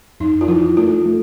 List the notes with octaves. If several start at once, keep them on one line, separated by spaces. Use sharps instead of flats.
F2 D#4
F4
F3 E4
A3 F4
A3